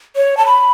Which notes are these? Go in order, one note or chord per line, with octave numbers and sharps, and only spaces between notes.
C#5
A5
B5